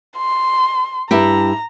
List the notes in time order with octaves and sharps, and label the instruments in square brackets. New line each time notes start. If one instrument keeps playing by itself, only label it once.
[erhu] C6
[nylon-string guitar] G2 E4 G4 [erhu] A#5